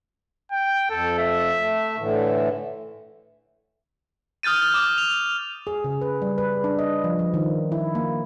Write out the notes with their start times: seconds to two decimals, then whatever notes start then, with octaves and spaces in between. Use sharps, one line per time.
0.52 G5
0.90 F2 A4
1.19 E5
1.58 A3
1.98 A2 D3 E3
4.43 D#6 F6 G6 A6 D#7
4.74 D6
4.98 F7
5.67 G#4
5.84 C#3
6.01 B4
6.22 G3
6.38 B4
6.64 D4
6.79 D#5
7.04 F3
7.19 F3
7.34 D#3
7.72 E4
7.95 A#3